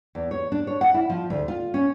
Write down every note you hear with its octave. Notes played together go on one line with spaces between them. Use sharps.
E2
C#5
D4
C#5
F#5
E4
F3
D2
F4
C#4